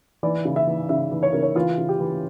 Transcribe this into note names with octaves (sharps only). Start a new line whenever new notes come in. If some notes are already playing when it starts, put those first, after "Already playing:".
E3 D5
C#3
E5
E3
C#3 E5
E3
C#5
C#3 A#4
C#5
E3 F4
C#3
G4
E3